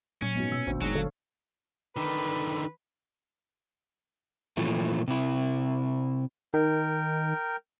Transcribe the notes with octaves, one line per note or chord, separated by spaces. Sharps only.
A#2 F#3 C#4 C#7
G#2 B3 F#4
B2 E6
A1 D2 D4 C5
G1 D#3 F#3 G#3
D3 A4 C#5 F5
D3 D#3 B4
A#2 E3 F3 A3
C3 E4
D#3 A#4 G5